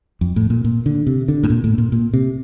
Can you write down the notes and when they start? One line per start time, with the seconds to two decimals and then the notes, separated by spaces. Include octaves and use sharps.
0.21 F2
0.36 A2
0.50 A#2
0.65 A#2
0.86 D3
1.07 C3
1.28 D3
1.43 A2
1.50 A#2
1.64 A2
1.78 A#2
1.92 A#2
2.13 C3